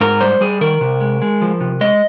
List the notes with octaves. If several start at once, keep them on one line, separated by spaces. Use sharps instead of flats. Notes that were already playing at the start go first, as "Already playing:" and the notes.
G#2 A#4
G3 C5
G3 G#4
D#3 A#4
C3
G#3
G#3
F3
C3
G#3 D#5